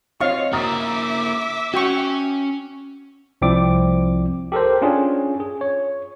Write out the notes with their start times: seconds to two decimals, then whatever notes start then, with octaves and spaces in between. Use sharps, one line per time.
0.21 C4 F4 C#5 D#5 F5 C#6
0.53 A#3 E4 E5 A#5 D6 D#6 A6
1.74 C#4 F#4 G5 C#6
3.42 C2 F3 C4 E4 D5 D6
4.52 G4 A4 A#4 C5
4.82 C#4 D4 F4 G#4
5.40 G#4
5.61 C#5